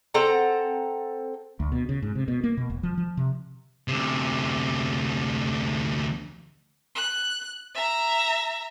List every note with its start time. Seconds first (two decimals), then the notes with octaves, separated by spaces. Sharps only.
0.14 C4 A4 F#5 A#5
1.60 D2
1.72 B2
1.89 C#3
2.02 G#2
2.15 C3
2.28 B2
2.44 A#3
2.57 B2
2.70 E1
2.83 F3
2.98 F3
3.17 C3
3.88 D2 C3
6.96 F#6
7.75 E5 A#5